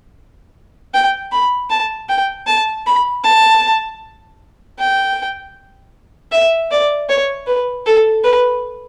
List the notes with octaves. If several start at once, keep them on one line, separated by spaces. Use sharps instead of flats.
G5
B5
A5
G5
A5
B5
A5
G5
E5
D5
C#5
B4
A4
B4